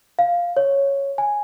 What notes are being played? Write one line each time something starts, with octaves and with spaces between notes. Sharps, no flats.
F5
C#5
G#5